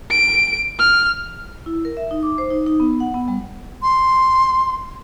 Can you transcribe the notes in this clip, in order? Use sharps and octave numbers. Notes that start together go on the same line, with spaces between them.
D7
F6
E4
A#4
E5
D#4
D6
C5
D#4
D#4
B3
F#5
B3
G3
C6